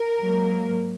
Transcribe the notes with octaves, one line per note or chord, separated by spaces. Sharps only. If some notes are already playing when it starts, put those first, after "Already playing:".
Already playing: A#4
G#2 F#3 A#3